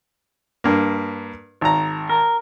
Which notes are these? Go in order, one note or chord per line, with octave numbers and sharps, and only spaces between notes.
G2 A#3
G#1 A#5
A#4